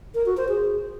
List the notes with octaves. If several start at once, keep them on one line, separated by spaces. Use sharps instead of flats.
A#4
F#4
C5
G#4